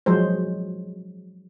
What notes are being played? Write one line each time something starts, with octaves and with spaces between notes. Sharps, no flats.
F3 F#3 G#3 C5